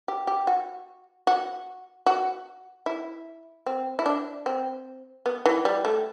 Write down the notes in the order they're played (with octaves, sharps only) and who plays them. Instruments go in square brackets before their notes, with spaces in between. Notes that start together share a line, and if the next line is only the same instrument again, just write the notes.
[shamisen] G4
G4
F#4
F#4
F#4
E4
C4
E4
D4
C4
B3
E3
G3
A3